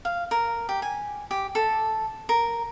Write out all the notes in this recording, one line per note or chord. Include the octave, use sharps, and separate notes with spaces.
F5
A#4
G4
G#5
G4
A4
A#4